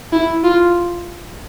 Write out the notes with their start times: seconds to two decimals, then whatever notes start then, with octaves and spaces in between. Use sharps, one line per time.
0.12 E4
0.44 F4